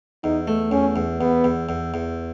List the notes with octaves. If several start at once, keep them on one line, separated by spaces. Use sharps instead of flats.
E2 D#4
A3
E2 C#4
E2
E2 B3
E2
E2
E2